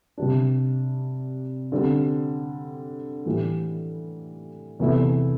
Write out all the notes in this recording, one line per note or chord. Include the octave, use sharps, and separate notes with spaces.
C3 G3 D4
D3 G3 C4
A2 E3 G3
E2 C3 E3 A3 E4